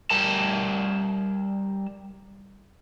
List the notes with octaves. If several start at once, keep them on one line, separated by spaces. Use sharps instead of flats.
G3 A#4 A5